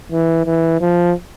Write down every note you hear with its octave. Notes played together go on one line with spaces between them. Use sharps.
E3
E3
F3